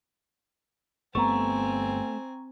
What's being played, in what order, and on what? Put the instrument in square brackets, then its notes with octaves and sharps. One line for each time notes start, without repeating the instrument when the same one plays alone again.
[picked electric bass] G1 B3 [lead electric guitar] A3 [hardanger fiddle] C4 G#5 [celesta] A#5 C#6